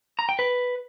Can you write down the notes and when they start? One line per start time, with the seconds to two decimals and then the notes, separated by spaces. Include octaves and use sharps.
0.19 A#5
0.29 G5
0.39 B4